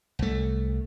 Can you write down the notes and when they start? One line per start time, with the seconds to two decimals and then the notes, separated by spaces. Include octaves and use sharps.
0.19 C2 A3